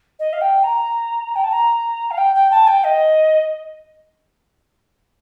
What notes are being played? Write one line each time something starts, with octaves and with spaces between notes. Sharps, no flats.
D#5
F5
G5
A#5
G5
A5
A#5
F5
G5
G5
A5
G5
D#5